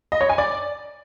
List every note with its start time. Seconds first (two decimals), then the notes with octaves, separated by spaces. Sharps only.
0.12 D#5
0.21 C#5
0.29 G#5
0.38 D5